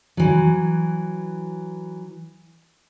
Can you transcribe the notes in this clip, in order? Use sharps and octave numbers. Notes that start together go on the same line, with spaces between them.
E3 F#3